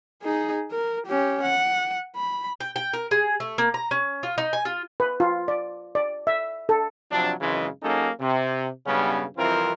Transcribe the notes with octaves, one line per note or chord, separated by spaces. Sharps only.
D#4 G#4
A#4
C#4 G4
F#5
B5
G5
G5
A#4
G#4
A3
A#3
A#5
C#4
F4
D#4
G#5
F4
B4
F4
D5
D5
E5
A4
C3 F3 F#3 D4
G#1 F#2 C#3 E3 G#3
F#3 A#3 C#4 D#4 G#4 A4
C3
B1 G2 C#3 G3 B3 C#4
C2 F2 E3 C4 F4 A#4